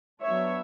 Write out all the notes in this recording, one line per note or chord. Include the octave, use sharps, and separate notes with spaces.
F#3 B3 D4 C#5 E5